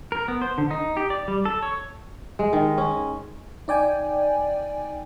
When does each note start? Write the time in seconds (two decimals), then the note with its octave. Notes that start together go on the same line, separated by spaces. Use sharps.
0.12 A#4
0.28 B3
0.42 C5
0.58 D3
0.71 D#4
0.97 G4
1.10 D5
1.28 G3
1.45 A4
1.62 C#5
2.39 G#3
2.53 D#3
2.78 C#4
3.68 D#4 D5 G5 G#5